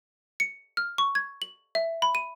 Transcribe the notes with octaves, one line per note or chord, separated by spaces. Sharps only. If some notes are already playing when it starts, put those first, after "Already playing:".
C#7
F6
C#6
G#6
F#7
E5
B5
D#7